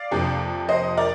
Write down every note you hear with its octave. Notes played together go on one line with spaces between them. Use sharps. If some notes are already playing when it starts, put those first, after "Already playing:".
Already playing: D5 F5
F2 C3 F3 A#3 D4
C5 D#5
A#4 D5